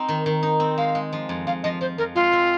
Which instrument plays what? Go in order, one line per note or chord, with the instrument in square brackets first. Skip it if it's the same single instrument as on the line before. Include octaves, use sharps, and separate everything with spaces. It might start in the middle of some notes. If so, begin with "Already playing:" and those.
Already playing: [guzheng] C4 D#4
D#3
D#3
D#4
C4
[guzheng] G#3 [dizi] F5
[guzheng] G#3
F3
F2
[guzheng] F2 [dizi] F5
[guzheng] F3 [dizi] D#5
[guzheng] F3 [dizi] C5
[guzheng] F2 [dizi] A#4
[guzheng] G#3 [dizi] F4
[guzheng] C4